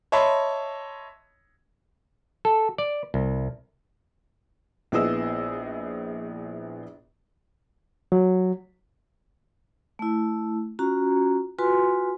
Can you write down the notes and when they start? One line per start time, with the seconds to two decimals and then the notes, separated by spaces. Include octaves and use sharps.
0.12 C#5 D#5 E5 A5 B5 C6
2.45 A4
2.78 D5
3.14 C2
4.92 A#1 B3 E4 G#4 D#5 E6
8.12 F#3
9.99 A3 E4
10.79 C#4 F4 F#4 A#5
11.59 F4 F#4 B4 G#5 C6